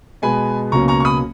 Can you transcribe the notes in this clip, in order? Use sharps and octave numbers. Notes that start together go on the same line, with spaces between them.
B2 G#3 B3 G#5 B5
C#2 B2 F#3 A#3 C#4 A#5 C#6
A#5 C#6
C#6
B5 D#6